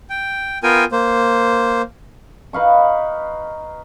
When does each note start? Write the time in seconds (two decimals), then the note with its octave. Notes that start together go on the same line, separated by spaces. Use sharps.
0.10 G5
0.63 B3 F4 A#4 G5 G#5
0.92 A#3 C5
2.53 D#4 B4 F5 C#6